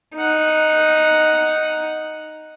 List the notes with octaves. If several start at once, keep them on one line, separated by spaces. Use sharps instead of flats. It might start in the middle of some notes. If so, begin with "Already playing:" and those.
D#4 F#5